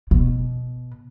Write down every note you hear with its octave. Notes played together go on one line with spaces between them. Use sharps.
B2